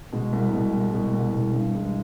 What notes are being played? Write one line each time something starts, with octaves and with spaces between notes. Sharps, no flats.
B2 G#3
C2
B2 G#3
C2
B2 G#3
C2
B2 G#3
G2
E3 G#3